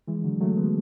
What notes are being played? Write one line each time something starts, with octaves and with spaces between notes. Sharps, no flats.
E3 G#3
D3 F#3
F#3 A3
G#3 B3